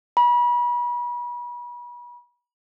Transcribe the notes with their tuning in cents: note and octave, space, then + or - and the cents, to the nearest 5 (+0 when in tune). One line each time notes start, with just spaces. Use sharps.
B5 -35